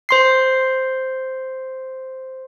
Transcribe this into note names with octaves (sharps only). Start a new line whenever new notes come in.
C5 C6 C7